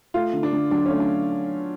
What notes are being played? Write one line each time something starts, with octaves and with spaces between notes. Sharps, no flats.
A3 F4
D3
D4
D3
F#3 D4
C#4
A3
D4